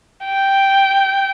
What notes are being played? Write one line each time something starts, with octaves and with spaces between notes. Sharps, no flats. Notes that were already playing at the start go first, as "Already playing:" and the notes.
G5